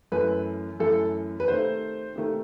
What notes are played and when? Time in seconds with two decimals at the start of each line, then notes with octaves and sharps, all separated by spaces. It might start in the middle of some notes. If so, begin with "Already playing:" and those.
0.12 F#2 E3 A3 B4
0.80 F#2 E3 A3 A4
1.40 B4
1.48 C3 D#3 A3 C5
2.16 C3 D#3 A3